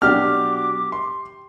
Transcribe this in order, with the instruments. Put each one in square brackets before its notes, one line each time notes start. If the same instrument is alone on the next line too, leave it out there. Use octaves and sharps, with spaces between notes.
[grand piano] B2 F#3 D4 [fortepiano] G4 F6 [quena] D6
[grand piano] C6